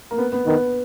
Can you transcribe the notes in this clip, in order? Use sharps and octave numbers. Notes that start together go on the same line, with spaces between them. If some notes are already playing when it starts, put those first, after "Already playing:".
A#3
B3
B3
D#3 B3